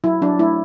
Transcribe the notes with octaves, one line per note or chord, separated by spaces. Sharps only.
F#3 E4
F#3 D4
A3 E4